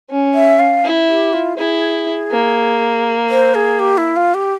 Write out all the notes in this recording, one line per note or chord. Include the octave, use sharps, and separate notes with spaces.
C#4
E5
F5
E4
G4
F4
E4 G#4
A#3
C5
G#4
G4
E4
F4
G4